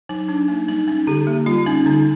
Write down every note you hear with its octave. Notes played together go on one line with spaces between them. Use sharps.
F#3 D#4
F#3 D4
A#3 D#4
G3 D#4
C#4 D#4
D3 G4
A#3
G3 F4
C#4 D#4
D3 D#4